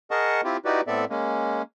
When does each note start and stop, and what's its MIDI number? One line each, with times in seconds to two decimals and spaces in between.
0.11 0.41 68
0.11 0.41 70
0.11 0.41 75
0.11 0.41 78
0.11 0.41 81
0.11 0.41 85
0.44 0.57 60
0.44 0.57 64
0.44 0.57 65
0.44 0.57 67
0.65 0.81 63
0.65 0.81 64
0.65 0.81 66
0.65 0.81 67
0.65 0.81 71
0.65 0.81 74
0.87 1.05 45
0.87 1.05 59
0.87 1.05 60
0.87 1.05 69
0.87 1.05 74
0.87 1.05 76
1.10 1.62 56
1.10 1.62 58
1.10 1.62 61